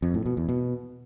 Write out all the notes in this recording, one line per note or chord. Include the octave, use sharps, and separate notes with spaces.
F2
A2
B2
E2
B2